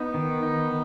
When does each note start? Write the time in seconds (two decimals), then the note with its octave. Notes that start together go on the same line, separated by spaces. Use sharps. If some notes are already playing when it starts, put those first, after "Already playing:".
Already playing: B3 D#4
0.14 D#3
0.43 D#4